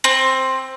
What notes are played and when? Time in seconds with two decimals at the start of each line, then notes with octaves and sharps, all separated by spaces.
0.04 C4